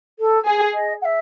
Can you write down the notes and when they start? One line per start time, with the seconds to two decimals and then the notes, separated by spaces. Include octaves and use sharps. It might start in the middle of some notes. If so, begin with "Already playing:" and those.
0.19 A4
0.46 G#4
0.74 D#5
1.01 F#5
1.05 E5